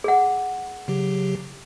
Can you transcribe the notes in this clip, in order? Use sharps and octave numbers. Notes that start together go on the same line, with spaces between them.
G#4 F#5
C#3 F#3 G4